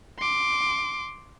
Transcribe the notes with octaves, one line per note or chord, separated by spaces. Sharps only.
C6 D6